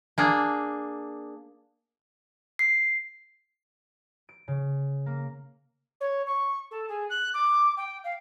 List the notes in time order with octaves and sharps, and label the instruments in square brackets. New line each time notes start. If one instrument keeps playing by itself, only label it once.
[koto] A#3 D4 G#4
[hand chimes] C7
[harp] D7
C#3
A#3
[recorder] C#5
C#6
A4
G#4
F#6
D6
G5
F5